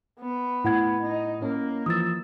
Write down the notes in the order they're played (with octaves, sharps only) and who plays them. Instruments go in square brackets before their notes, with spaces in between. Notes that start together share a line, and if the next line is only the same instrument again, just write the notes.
[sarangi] B3
[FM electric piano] A2 [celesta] E4 F#5 G#6
[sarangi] D#4
[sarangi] A#3 [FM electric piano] C#4
[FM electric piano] E3 F3 E6 [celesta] D#6 A6